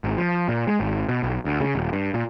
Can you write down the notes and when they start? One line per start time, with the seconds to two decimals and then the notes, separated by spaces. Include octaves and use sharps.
0.04 G#1
0.18 F3
0.48 A#2
0.67 G#3
0.80 G#1
1.08 B2
1.23 B1
1.45 D2
1.60 C#3
1.75 D#1
1.93 G2
2.14 A#2